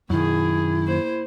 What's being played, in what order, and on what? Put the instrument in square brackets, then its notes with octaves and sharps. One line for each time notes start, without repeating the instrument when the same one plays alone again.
[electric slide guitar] F#2 D#3 [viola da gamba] B2 G#4 [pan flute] E4
[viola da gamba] A#3 C5